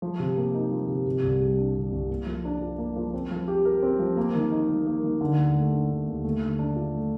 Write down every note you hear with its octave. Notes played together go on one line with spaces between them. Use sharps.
F3
C3
A#3
D#4
F3
C3
C3
C2
G3
D4
C3
C2
A#3
F3
D4
F4
A#3
F3
C4
F3
G4
A#4
C4
F3
A#3
D#3
D#4
D#3
A#3
D#3
D3
D#2
A3
D4
D3
D#2
A3
D3
D4
F4
A3